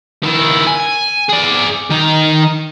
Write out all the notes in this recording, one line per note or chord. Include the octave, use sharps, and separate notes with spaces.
D#3 E4
G#5
G#4 D5
D#3 D#4